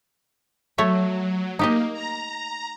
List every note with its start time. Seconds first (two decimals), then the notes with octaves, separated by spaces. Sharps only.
0.78 F#3 A3 C#5 E5
1.59 A#3 D#4 G4 D#5
1.93 A#5